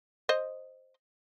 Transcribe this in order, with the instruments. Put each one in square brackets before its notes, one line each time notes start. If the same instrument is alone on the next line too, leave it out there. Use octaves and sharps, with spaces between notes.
[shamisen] C5 D#5